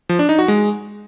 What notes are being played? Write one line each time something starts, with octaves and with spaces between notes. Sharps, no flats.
F3
D4
D#4
F#4
G#3